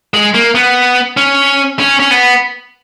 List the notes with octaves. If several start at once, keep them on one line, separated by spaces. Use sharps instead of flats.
G#3
A#3
B3
C#4
C#4
C#4
B3